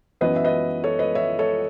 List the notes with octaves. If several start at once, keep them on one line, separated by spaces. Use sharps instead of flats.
F#2 E3 B3 B4 D#5
E5
B4 D#5
A4 C#5
B4 D#5
C#5 E5
A4 C#5